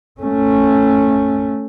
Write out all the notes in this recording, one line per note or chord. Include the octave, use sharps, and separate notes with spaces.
A3 C#4